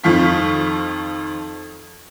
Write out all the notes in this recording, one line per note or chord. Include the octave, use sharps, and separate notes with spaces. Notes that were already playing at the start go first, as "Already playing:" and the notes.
F2 D#3 F3 F5 C#6 B6